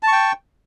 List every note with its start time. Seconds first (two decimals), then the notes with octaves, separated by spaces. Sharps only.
0.03 A5
0.08 C#6
0.12 G5